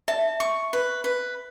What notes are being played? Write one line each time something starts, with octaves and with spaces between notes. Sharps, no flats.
E5 A5
C#6
B4
B4